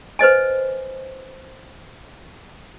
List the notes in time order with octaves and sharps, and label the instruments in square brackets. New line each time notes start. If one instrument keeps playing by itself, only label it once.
[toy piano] B4 C5 D#5 G#5